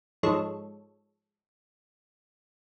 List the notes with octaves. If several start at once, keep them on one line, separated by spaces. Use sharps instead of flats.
G#2 F3 G#3 A4 C#5